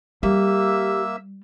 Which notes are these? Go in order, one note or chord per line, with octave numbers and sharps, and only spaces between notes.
G3 A#3 G4 E5 E6